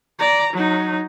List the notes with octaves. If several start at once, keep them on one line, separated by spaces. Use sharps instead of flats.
D5 A#5
F#3 D#4